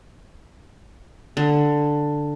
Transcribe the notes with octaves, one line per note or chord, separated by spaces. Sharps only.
D3